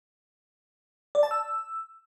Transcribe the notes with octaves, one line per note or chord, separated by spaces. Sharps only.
D5
A5
E6